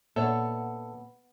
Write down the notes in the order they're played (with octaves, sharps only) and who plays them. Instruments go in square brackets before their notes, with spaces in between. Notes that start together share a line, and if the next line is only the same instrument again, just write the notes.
[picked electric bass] A#2 [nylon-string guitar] B3 [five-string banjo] D4 C#5 E5 [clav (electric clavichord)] A4